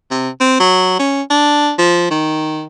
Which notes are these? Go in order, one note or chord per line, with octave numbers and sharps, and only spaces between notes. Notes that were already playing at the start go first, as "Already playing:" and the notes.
C3
C4
F#3
C#4
D4
F3
D#3